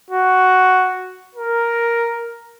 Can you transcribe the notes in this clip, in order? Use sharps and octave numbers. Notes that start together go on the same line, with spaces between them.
F#4
A#4